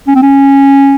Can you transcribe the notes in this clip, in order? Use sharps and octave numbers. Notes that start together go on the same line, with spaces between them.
C#4
C4
C#4